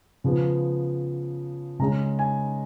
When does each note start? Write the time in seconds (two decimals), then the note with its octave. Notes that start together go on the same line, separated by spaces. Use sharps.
0.24 C#3 F3 B3
1.79 C#3 G#3 C#4 A#5
2.19 G#5